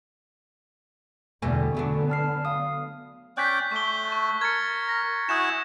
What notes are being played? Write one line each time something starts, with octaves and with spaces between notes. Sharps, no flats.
E2 B2 D3 G3 A3 G#5
D3 F#3 A3 B3 D4
A5 F6 C7
F5 D#6
C#4 D5 G5 F#6 G6 B6
A3 C#6 G7
C#6
A#4 G#6 A6 C#7
A#6
E4 F#4 G#5 D#6 G6 E7